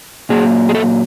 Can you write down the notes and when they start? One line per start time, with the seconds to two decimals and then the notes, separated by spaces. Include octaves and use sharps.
0.29 A#2 F#3 A#3 G#4
0.69 G#4
0.75 A4